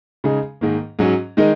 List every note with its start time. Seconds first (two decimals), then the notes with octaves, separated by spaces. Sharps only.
0.24 C#3 G#3 D#4 G#4
0.61 G#2 D#3 A#3
0.99 G#2 F#3 C#4
1.37 D#3 G#3 D#4 A#4